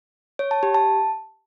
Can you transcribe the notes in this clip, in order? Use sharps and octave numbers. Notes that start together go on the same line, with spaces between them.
C#5
A5
G4
A5